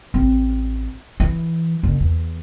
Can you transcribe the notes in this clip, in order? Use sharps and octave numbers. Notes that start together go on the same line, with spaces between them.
A1 C4
E3
F#1
E2